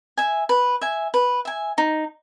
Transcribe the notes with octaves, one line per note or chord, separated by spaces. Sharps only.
E5 G#5
B4
E5 G#5
B4
E5 G#5
D#4